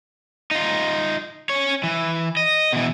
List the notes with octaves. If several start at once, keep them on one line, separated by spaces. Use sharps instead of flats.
D#4 F4
C#4 C#5
E3
D#5
B2 E3